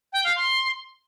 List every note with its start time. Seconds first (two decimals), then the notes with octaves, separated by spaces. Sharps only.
0.13 G5
0.24 F5
0.36 C6